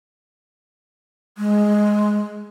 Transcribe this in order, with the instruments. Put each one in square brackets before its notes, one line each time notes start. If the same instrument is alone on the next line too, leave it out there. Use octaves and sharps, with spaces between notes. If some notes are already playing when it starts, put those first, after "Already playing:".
[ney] G#3